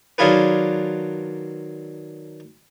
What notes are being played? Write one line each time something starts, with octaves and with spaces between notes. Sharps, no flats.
D#3 F#3 D4 F4 G#4 B4